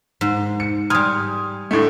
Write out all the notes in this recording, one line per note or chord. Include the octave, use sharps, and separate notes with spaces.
G#2
C#7
G3 G#5 C6 D#6 F6
A2 D3 A3